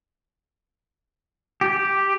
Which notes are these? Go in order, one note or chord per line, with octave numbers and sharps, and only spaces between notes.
G4